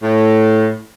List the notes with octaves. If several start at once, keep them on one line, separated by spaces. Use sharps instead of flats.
A2